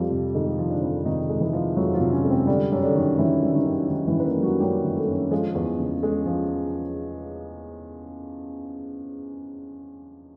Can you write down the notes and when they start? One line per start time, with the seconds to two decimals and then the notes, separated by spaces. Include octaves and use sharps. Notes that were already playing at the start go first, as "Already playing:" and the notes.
Already playing: F2 F3 G3 G4
0.11 C3
0.35 D#3 G#3 D#4
0.59 F3
0.70 D3 D4
0.82 F2
1.05 C3 D#3 D#4
1.29 G#3
1.41 E3 E4
1.53 F3
1.77 F2 F#3 F#4
1.94 F3 F4
2.00 C3
2.13 C#4
2.24 G#3
2.31 C4
2.47 D3 G3 D4
2.72 F#2
2.83 D3 D4
2.95 D#3
3.18 F#2 E3 E4
3.43 G3
3.54 D#3 D#4
3.66 F#2
3.90 D#3
4.07 E3 E4
4.13 F#2
4.20 B4
4.25 A#3 A#4
4.37 G3
4.43 F#3 F#4
4.60 F#2 G3 G4
4.84 D#3
4.96 A3 A4
5.09 F#2
5.31 F3 G#3 G#4
5.55 E2
5.79 C#3
6.03 G#3
6.26 F3